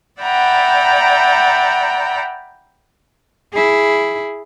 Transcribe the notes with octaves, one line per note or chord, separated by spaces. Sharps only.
D5 E5 F#5 G5 A#5 B5
E4 G#4